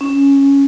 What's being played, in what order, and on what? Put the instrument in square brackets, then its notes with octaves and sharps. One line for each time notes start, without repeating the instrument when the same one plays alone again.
[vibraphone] C#4